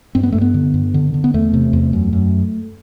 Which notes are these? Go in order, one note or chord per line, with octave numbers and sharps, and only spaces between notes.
G2 C4
B3
G2 A3
B3
D3
G2
D3
D3
B3
E2 A3
C3
E2
F#2
F#2